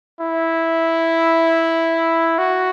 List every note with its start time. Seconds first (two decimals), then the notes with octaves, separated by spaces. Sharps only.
0.21 E4
2.38 F#4